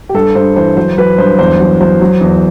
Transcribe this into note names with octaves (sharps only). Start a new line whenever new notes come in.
G4
G2 A4
G2 C5
E3 C5
F#3 C5
F#3 B4
G2 C5
E2 C5
F#3
F#3 C5
F#3
E2